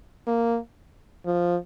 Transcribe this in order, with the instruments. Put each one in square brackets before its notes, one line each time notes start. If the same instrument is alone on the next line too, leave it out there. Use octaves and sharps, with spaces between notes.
[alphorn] A#3
F3